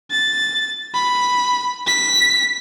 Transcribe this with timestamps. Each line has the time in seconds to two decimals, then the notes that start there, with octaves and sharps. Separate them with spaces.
0.11 A6
0.94 B5
1.87 B6